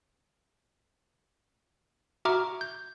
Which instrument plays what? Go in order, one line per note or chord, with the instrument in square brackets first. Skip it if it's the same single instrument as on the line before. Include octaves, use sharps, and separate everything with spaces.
[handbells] F#4 E5 A#5 C#6 D6 F6
G6